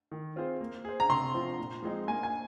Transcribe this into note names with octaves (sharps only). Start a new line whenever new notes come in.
D#3
C4 F4 G#4 C5
A#3
G#4 C5
A#5
C3 C6
F3 C4 F4
A#2
F3 G#3 C4 D#4
A#3 G#5
G#5